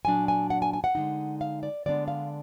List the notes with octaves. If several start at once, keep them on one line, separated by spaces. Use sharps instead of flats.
A#2 F#3 D4 G#5
G#5
F#5
G#5
G#5
F#5
D3 G#3 D#4
F5
D5
D3 G#3 B3 D4 D5
F5